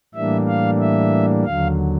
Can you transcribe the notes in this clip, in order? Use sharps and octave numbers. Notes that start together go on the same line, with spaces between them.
A2 E3 G3 A#3 D4 E5
F5
E5
D#2 D3 F#3 F5